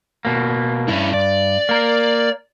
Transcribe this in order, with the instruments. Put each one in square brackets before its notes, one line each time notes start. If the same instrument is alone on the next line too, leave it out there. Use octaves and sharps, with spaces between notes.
[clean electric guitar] B2 A#3
[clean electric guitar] G2 [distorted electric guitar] C#4 E4
[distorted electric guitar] D5
[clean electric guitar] A#3 A#4